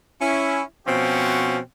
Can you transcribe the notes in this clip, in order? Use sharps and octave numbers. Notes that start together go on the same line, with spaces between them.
C#4 E4
B2 F3 C4 C#4 F#4